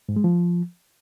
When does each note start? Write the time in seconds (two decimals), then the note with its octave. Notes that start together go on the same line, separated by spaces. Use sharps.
0.09 G#2
0.16 G#3
0.24 F3